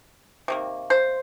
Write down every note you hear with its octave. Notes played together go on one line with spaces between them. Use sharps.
C3 D#3 A#3
C5